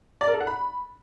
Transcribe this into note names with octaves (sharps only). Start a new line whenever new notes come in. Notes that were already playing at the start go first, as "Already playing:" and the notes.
D5
A#4
A4
F#5
B5